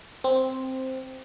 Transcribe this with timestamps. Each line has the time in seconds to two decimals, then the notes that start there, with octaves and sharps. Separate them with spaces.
0.24 C4